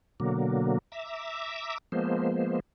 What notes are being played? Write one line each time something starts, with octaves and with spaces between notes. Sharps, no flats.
B2 D3 F#3 A#3
E5 A#5 D6 E6
F3 G#3 A#3 B3 C5